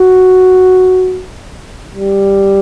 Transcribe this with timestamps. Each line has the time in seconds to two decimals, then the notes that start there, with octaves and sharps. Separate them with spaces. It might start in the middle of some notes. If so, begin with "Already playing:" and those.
Already playing: F#4
1.94 G3